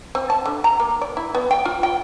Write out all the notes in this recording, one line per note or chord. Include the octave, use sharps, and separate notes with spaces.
C4
A5
D3
A#5
A#3
D5
E4
B3
G5
F4
G5